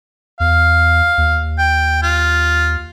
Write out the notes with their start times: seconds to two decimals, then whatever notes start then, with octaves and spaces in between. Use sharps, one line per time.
0.40 E2 F5
1.18 D#2
1.59 G5
2.03 F4